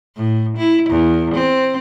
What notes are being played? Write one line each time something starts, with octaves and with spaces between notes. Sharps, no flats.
A2
E4
E2
C4